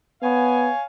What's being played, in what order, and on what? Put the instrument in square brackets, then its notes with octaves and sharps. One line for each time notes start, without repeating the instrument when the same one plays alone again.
[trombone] B3 [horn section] C#5 F5 G#5